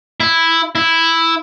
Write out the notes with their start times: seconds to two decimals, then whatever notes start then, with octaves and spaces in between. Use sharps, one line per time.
0.20 E4
0.75 E4